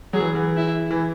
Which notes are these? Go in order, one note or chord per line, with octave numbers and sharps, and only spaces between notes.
F#3 G#4
E3
E3
E4
E3